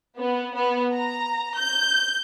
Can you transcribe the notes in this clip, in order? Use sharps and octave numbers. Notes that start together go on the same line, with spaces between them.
B3
B3
A#5
G6